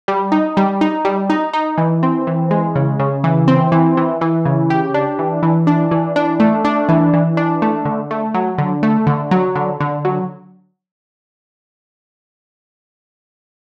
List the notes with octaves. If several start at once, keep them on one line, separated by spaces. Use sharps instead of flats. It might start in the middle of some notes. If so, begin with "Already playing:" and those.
G3
D#4
G3
D#4
G3
D#4
D#4
E3
C4
E3
G#3
C#3
C#3
E3
C4
E3
E3
E3
C#3
G4
D4
E3
E3
D4
E3
D4
A3
D4
E3
E3
D4
A3
D3
A3
F#3
D3
A3
D3
F#3
D3
D3
F#3